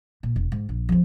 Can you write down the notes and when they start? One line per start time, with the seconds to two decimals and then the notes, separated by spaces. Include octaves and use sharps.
0.23 A#2
0.36 E1
0.52 G#2
0.69 A#1
0.89 F3 C4